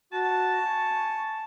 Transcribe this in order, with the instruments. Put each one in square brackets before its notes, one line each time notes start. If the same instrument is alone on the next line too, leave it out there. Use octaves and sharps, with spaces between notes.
[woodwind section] F#4 [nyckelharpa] A5
[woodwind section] G#5 C#6